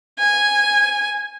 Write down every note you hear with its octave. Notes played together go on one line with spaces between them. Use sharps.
G#5